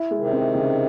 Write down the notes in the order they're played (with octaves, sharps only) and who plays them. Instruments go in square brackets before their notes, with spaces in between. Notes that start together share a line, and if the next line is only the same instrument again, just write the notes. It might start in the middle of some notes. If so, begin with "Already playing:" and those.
Already playing: [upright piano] E4
G#3
[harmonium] C3 D#3
[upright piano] C4
C#3